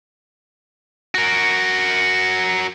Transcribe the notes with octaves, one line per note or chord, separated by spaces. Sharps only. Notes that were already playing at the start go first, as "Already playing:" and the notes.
F#4 A#4